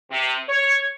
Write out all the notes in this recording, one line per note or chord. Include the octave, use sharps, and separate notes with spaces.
C3
C#5